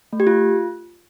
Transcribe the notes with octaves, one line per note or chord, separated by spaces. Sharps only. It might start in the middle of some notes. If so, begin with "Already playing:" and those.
A3
G4
F4